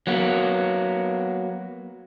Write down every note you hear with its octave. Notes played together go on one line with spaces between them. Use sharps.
F#3 A#3 B3